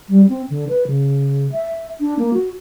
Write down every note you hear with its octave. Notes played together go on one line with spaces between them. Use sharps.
G3
C4
D3
B4
C#3
E5
D4
A#3
F#4